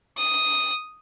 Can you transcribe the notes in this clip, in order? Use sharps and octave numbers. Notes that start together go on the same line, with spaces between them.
D#6